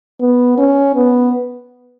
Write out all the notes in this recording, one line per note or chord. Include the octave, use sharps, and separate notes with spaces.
B3
C#4
B3